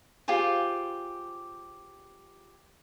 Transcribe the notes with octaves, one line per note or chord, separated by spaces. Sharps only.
F4 G4 G#4 C5